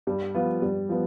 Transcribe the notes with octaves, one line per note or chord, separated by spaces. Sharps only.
G2 G3
F3 B3 F4
G2 G3
F3 B3